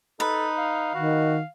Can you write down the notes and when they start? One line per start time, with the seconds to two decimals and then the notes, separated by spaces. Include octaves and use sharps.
0.20 D#4 A4 B4
0.58 F5
0.95 D#3 F#4